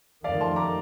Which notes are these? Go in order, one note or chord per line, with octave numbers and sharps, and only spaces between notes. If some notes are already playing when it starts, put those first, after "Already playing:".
F2 D#3 A3 D5 F5
A5 C6
A#5 D6